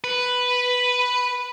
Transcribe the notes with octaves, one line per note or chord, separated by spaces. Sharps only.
B4